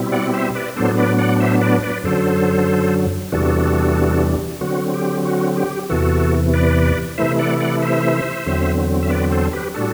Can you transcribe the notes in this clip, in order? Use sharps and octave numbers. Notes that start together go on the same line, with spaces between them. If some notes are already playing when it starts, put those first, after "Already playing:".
Already playing: B2 G3 C4 E4
D5 F#5
C5 E5
B4 D5
A2 F#3 B3 D4 A4 C5
B4 D5
D5 F#5
C5 E5
B4 D5
B4 D5
F#2 D3 F#3 A4 C5
E2 C3 E3 G3 D4 F#4 A4
D3 F#3 C4 F#4
G4
F#4
G4
E2 C3 E3 F#4 A4
B4 D5
C3 E3 A3 E4 C5 E5
D5 F#5
D5 F#5
C5 E5
E2 D3 F#3 C4
E5
B4 D5
A4 C5
G4 B4
A2 G3 D4 F#4 A4